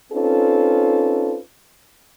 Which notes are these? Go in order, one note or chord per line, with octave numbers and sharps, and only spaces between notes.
C4 C#4 D#4 F4 A4 B4